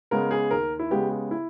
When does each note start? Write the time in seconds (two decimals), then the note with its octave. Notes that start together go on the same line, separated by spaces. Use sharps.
0.11 C#3 G#3 B3 A#4
0.31 G#4
0.51 D#2 A#4
0.79 E4
0.91 C#3 G#3 B3 G4
1.11 G4
1.31 E4